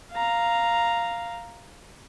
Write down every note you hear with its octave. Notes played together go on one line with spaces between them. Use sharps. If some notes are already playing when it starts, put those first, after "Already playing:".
F5 A#5